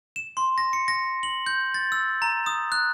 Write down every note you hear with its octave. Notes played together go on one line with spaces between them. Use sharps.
E7
C6
A#6
C#7
A#6
F#7
G6
A6
E6
A#5
D#6
F#6